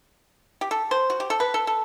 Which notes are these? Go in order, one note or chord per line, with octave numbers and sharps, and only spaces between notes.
G4
A4
C5
F#4
G4
A4
B4
A4
A4